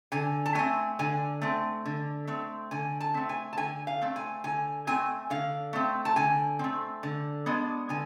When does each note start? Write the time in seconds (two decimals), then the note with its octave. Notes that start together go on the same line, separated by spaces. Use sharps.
0.12 D3 G#5
0.46 A5
0.55 A3 C4 G#5
0.99 D3 G#5
1.42 A3 C4
1.86 D3
2.27 A3 C4
2.71 D3 G#5
3.00 A5
3.14 A3 C4
3.29 G#5
3.53 A5
3.57 D3 G#5
3.87 F5
4.01 A3 C4
4.16 G#5
4.44 D3 G#5
4.87 A3 C4 G#5
5.30 D3 F5
5.73 A3 C4
6.05 A5
6.16 D3 G#5
6.59 A3 C4
7.03 D3
7.46 G#3 B3 D4
7.89 D3 G#5